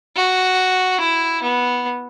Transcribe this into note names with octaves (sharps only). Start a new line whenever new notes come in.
F#4
E4
B3